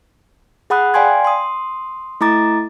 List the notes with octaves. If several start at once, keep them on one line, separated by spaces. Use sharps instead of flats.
G#4 F#5 B5 D#6 F#6
D5 F5 G5 G#5 C6 G#6
C6 D#6
A3 E4 A#5 D6 A6